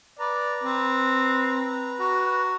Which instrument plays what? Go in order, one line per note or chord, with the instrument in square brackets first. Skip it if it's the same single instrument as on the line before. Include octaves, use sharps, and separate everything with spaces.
[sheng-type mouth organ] B4 A#5 [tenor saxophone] D5
[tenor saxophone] C4
F#4